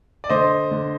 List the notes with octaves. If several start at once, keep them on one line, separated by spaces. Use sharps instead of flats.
D5
D3 C5 D#5
D3